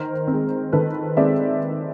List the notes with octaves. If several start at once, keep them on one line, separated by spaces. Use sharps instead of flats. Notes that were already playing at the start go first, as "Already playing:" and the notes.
Already playing: D#3 A#4 C5
C4
G#3
D#3 A4 B4
G#3 C4 D5 E5